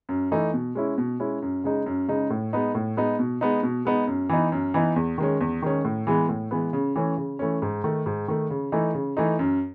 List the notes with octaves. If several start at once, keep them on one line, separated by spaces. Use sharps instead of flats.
F#2
E3 A3 D#4
B2
G#3 C#4 E4
B2
G#3 C#4 E4
F#2
C#3 G#3 D#4
F#2
C#3 G#3 D#4
A2
G#3 B3 D#4
A2
G#3 B3 D#4
B2
G#3 B3 D#4
B2
G#3 B3 D#4
F#2
E3 B3 D#4
F#2
E3 B3 D#4
E2
D#3 G#3 C#4
E2
D#3 G#3 C#4
A2
E3 G#3 B3
A2
E3 G#3 B3
C#3
E3 A3 C#4
C#3
E3 A3 C#4
G#2
D#3 A3
G#2
D#3 A3
C#3
E3 A3 D#4
C#3
E3 A3 D#4
F#2